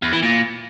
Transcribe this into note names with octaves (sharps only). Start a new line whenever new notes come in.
E2
E3
A#2